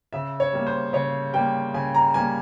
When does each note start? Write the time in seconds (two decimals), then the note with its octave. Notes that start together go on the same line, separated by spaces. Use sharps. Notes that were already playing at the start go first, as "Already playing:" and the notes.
0.13 C#3 E5
0.40 C#5
0.53 G3 A#3
0.67 C5
0.93 C#3 C#5
1.33 G3 A#3 G5
1.74 C#3 G#5
1.95 A#5
2.14 G3 A#3 G#5